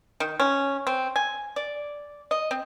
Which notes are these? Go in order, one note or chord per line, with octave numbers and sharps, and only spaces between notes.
D#3
C#4
C4
G#5
D5
D#5
C4